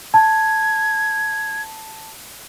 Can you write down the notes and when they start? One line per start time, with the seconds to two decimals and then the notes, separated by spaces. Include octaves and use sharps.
0.14 A5 G#6